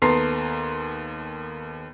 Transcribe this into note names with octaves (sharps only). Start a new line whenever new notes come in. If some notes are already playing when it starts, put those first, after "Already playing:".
D#2 B3 A4 A#5 C6 C7